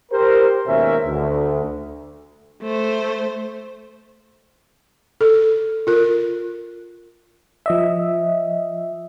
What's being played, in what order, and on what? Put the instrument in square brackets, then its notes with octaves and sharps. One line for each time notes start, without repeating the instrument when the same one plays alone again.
[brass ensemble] G4 A#4 C5
D#2 G#2 B2 C#4 A#4 E5
D2
[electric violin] A3 C5
[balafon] A4
F4 A#4
[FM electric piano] F3 D#5 E5